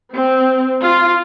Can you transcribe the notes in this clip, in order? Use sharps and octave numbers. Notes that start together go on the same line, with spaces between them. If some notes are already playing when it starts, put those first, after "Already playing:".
C4
F4